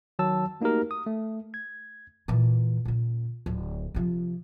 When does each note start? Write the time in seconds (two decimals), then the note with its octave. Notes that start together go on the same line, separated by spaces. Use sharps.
0.19 D#3 F#3 A5 E6
0.61 A3 A#3 D#4 F#4 G4 A#4
0.91 D#6
1.07 A3
1.54 G#6
2.28 A#2 E3
2.85 A#2 C#3
3.46 D1
3.95 C3 F3